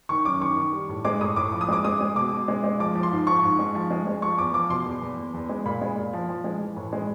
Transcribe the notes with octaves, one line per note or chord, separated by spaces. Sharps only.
D#3 C#6
F#2 D6
D#3 C#6
D#3
G3
A2
G#3 D6
A2 D#6
A2 D6
F3
D#6
G#3 D6
G#3 D#6
G#3
B2 D6
B2
G#3
G#3
F3 D6
F3
C6
G#2
F3 C#6
G#2
G#3
F3
G#3
G#3
F3 C#6
E2 D6
F3 D6
B2 C6
E2
E2
E2
E2
G#3
A#2 B5
G#3
A#2
F3
F3
G#3
E3
A2
G#3